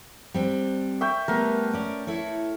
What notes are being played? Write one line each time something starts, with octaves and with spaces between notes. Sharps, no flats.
G3 C4 D4
E5 G5 C#6
G3 A3 B3 A#4
C#4 D5
E4 A4 C#5